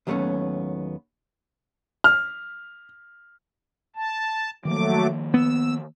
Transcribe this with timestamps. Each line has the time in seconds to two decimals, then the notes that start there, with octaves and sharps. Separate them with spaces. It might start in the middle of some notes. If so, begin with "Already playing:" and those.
0.07 D#2 F#3 G3 A3 B3 C#4
2.04 F6
3.96 A5
4.65 D#3 F3 F#3 A3 A#3 D6
5.34 B3 E6